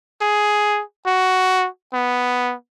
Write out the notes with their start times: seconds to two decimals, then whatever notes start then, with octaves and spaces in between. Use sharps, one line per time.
0.21 G#4
1.06 F#4
1.93 B3